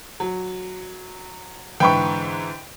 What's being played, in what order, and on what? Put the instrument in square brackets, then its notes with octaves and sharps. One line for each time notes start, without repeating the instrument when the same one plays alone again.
[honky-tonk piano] F#3
[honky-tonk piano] G#2 D3 E3 [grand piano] G5 B5 C#6